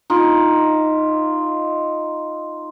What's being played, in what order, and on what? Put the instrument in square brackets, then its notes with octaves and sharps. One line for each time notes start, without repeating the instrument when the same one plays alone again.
[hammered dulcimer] D#4 F4